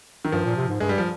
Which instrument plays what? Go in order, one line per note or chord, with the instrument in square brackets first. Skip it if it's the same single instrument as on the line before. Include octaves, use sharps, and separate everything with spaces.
[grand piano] D#3
[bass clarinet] G2 [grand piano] F3
[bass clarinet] A#2
C3
G#2
[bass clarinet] G2 [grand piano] G#3
[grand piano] G3
F3